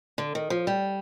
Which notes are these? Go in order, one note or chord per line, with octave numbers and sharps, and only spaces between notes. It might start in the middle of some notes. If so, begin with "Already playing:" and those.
D3
D#3
F3
G3